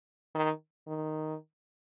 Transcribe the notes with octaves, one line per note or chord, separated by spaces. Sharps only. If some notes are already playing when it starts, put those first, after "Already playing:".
D#3
D#3